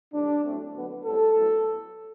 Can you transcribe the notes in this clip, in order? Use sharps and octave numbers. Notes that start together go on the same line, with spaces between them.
A1 A2 G3 D4
A2 F#3 A3 C4
D2 D3 F#3 B3
A2 G3 C4 A4
A2 F#3 B3